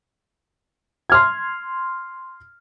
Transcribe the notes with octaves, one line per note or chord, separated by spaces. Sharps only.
C6 F6 G#6